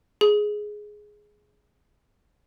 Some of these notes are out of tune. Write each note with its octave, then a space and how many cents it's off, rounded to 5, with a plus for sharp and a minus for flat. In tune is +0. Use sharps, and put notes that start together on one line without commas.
G#4 +10